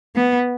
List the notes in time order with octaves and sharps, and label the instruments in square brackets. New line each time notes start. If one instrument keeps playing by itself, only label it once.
[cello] B3